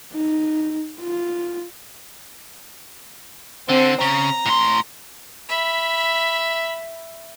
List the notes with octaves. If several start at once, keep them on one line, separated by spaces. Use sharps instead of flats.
D#4
F4
D3 C4
C#3 A#5
A2 C6
E5 B5